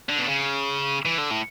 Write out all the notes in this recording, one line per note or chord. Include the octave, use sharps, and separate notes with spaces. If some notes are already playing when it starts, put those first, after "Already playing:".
D3
B2
C#3
E3
D3
A2